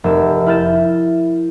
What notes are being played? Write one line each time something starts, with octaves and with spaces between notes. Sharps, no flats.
F1 A#4 E6
E4 F6 G6 A6 E7